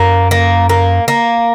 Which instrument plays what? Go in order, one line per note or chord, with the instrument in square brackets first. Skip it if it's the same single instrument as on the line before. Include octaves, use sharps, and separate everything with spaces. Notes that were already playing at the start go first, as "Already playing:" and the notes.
Already playing: [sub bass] F#2 [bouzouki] A#3
[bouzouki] A#3
A#3
A#3